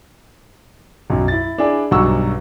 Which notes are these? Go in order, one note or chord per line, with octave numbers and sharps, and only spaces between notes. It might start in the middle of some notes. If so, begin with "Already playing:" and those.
B1 F#2
E4 A6
D4 E4 G#4 D5
B1 G2 F#3 F#5 C#6 E6